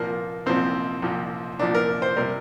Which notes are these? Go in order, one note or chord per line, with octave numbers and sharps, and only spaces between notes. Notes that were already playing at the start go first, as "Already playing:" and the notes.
Already playing: C2 A#2 F3 A#3
C2 A#2 F3 C4
C2 A#2 F3
C2 A#2 F3 D4
A#4
C5
C3 G3 A#4